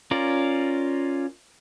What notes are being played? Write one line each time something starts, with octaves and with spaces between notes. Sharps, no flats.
C#4 F4 A#4 D5